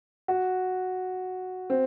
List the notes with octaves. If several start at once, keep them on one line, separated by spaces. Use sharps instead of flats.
F#4
C4